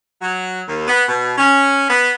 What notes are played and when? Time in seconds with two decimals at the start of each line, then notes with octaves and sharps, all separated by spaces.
0.22 F#3
0.67 D#2
0.88 B3
1.09 B2
1.38 C#4
1.90 B3